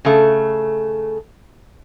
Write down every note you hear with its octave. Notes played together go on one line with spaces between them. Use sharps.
C#3 A3